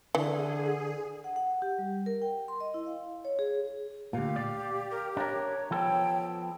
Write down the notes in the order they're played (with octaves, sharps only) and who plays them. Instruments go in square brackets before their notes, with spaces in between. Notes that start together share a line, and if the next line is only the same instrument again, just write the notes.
[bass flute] D3 [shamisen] E3 [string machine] G#4
[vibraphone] F#5
F#5
G4
G3
A#4
G5
C6
D#5
E4
F5
C#5
G#4
[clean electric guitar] D2 A#2 [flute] G4 [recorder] F5
[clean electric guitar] D5
[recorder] A#4
[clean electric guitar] D4 A#4 [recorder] C#5
[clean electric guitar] F3 B3 A4 [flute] G5